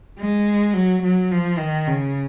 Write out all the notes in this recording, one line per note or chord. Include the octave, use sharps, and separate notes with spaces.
G#3
F#3
F#3
F3
D#3
C#3